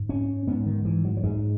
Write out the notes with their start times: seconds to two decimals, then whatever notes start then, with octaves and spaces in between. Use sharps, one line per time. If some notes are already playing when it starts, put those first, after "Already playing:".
Already playing: G#2
0.09 C#4
0.47 G#2 B3
0.66 D#3
0.85 E3
1.05 F#3
1.17 F#3
1.23 G#2 G#3